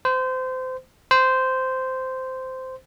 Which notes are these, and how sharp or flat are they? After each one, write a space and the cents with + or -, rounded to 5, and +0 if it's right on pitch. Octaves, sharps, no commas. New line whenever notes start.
C5 -25
C5 -10